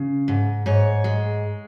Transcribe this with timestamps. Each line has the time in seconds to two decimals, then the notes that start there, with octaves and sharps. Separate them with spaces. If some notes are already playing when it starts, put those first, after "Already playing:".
Already playing: C#3
0.28 G#2
0.66 G#2 C#5
1.04 G#3